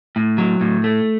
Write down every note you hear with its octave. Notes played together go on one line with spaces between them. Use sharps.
A2
F#3
A2
A3